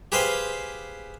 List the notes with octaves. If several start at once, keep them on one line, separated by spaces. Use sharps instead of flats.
G4 G#4 B4 C5 F5 G5